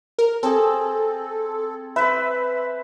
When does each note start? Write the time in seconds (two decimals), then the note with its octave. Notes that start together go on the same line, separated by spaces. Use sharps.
0.19 A#4
0.43 C4 G#4 A4
1.96 B4 C5 E5